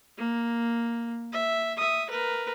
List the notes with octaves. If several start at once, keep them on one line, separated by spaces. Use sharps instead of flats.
A#3
E5
E5 D#6
A#4 B4